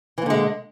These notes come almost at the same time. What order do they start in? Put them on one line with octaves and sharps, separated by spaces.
E3 A#2 D3 G#3